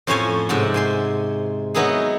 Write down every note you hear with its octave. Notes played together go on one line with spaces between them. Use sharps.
F2 A2 C#4 C5 C#5 G#5
G#2 C3 F#5
C5 G#5 C6
F#3 B3 D#4 E4 G#4